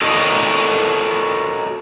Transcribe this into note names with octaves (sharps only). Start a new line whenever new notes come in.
F#4 A4 A#4 C#5 D#5